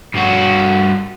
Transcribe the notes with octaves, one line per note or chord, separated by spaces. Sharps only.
G2 F#4